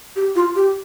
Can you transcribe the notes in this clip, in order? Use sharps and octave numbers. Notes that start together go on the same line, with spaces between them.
G4
F4
G4